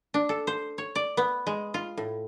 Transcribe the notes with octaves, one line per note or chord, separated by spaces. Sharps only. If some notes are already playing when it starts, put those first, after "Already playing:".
D4
A4
C5
C#5
D5
B3
G#3
F4
A2